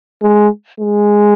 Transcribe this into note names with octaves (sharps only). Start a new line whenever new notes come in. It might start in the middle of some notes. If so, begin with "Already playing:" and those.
G#3
G#3